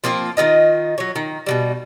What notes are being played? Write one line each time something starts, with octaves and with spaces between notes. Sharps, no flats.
F3 A#3 C4 F4
D#3 E4 F4 D#5
F#3 C#5
D#3
B2 D#3 G3